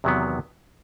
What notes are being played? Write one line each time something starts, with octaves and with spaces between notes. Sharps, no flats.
E2 C3 D#3 F#3 B3